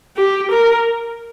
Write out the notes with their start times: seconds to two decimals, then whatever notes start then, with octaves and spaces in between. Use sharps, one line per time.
0.17 G4
0.51 A#4